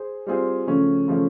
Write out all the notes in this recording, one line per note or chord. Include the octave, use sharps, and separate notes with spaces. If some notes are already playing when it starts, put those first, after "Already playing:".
Already playing: G#4 C5
G3 C4 F4 G#4 C5
C#3 F3 A3 C#4
C#3 F3 A3 C#4